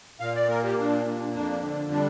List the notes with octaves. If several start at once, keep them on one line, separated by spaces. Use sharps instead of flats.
A#2 F5
D5
A#3 A#4
G4
A#2 D4
A#3
F2 D4
D3
G3 D4